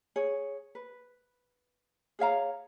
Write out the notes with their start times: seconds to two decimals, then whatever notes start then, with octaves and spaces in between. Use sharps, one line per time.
0.16 G#4 C#5
0.75 B4
2.19 G#4 C#5 F5 A#5